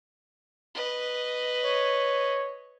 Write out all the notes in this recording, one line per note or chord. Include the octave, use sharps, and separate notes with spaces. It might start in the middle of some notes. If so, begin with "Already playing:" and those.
B4 D#5
C#5